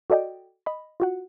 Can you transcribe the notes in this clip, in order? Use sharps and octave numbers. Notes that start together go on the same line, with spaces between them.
F#4 A4 D5 D#5 G5
D#5 B5
F4 F#4 F#5